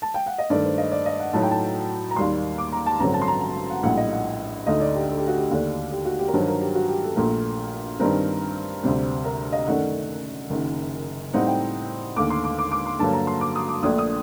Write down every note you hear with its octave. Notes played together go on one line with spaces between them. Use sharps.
A5
G5
F#5
D#5
G2 D#3 A3 D5
C5
D#5
D5
D#5
F#5
A2 F#3 A3 D#4 A5
G5
A5
A#5
D#2 D#3 G3 A#3 C6
D6
A#5
A5
A1 G2 D3 F#3 C4 A#5
A5
C6
A#5
A#5
F#5
A#1 A2 G3 F#5
D#5
F#5
D2 D3 A3 D#4 D#5
D5
G4
A4
G4
F#4
G4
D#2 D3 A3 D4
G4
F#4
G4
A#4
G2 D#3 F#3 C5
A#4
G4
F#4
G4
A4
A#1 A#2 A3 A#4
G2 D#3 G3 C4 A#4
D2 C3 G3 C5
A#4
D#5
F#2 D#3 A3 D4 F#5
F#1 F#2 D#3
A2 G3 C4 D#4 F#5
G5
D#2 D3 A3 D6
C6
D6
D6
D6
C6
G2 D3 F#3 A#3 A5
A#5
C6
D6
D#6
D6
A#1 A#2 A3 D4 D#6
D#6